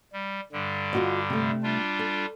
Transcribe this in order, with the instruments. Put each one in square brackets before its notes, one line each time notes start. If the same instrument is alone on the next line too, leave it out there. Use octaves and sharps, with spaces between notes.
[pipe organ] G3
G2 D3 G3
[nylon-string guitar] F4 F#4 D#5
C3 A3
[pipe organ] G3 D4 F4
[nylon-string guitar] A4